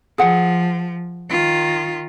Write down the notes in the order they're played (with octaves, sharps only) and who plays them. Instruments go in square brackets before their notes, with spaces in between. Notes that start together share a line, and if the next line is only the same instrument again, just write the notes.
[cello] F3 [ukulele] G#4 F#5
[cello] D#3 F4